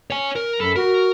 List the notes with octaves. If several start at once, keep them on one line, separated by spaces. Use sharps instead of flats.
C#5 G#5
A#4
F#2 F#3 A4 B5
F#4 A#4